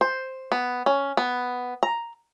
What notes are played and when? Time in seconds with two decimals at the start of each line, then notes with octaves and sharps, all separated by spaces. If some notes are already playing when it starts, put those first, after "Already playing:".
0.01 C5
0.52 B3
0.86 C#4
1.17 B3
1.83 A#5